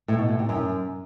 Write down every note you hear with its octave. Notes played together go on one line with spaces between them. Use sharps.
A2
B2
A2
C3
F#2